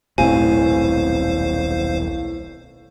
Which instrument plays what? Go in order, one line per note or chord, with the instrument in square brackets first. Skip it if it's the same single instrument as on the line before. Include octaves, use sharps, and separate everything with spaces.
[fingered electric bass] D#1 B1 C4 [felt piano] A2 [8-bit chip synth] C5 F5 [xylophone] G#5